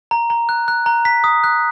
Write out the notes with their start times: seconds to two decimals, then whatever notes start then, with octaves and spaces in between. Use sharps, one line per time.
0.11 A#5
0.30 A#5
0.49 F#6
0.68 F#6
0.86 A#5
1.05 A#5 B6
1.24 D#6
1.44 F#6